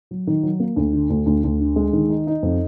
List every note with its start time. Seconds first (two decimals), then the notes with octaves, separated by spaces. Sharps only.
0.11 F#3
0.27 D#3
0.43 F#3
0.60 A#3
0.76 D2
0.93 D3
1.10 D2
1.26 D2
1.44 D2
1.60 D3
1.76 G#3
1.93 D#3
2.10 D#4
2.27 D#4
2.43 F2